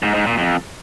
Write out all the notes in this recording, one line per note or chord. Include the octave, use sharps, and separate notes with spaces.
G#2
G#2
A#2
F2